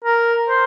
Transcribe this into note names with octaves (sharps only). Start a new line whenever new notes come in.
A#4
C5